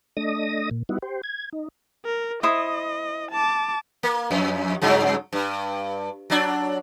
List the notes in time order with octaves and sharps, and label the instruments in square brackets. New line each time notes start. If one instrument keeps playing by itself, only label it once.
[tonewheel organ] A3 D4 D#5 D#6 A#6
A#2
G3 B3 D#4 E4 F#4
G4 C5
G#6
D#4
[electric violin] A#4
[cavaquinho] E4 C5 D#6 [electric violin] D#5
[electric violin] A5 D6
[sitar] A#3
F2
G2 C#3 F#3
G2
F#3 D4